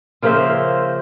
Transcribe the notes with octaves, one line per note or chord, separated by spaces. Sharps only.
C#3 F3 A#3 C5 E5